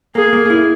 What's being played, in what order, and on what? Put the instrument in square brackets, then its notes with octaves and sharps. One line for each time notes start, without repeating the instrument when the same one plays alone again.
[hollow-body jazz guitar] A#3 [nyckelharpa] G#4
[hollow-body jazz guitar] A#3
E4